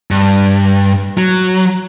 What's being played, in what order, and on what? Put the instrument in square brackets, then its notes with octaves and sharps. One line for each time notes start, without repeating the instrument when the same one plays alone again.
[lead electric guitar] G2
F#3